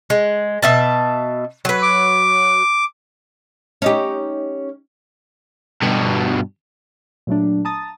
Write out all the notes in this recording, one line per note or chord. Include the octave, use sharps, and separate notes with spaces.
G#3
B2 E5 A5
F#3 B4
D6
C#4 D#4 G4
G2 B2
A#2 F#3 A3 D4
A5 A#5 D#6 A6